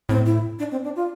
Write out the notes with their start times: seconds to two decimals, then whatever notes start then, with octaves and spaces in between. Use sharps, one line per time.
0.09 A2 C4
0.26 E4
0.59 D4
0.71 C4
0.84 D4
0.96 F4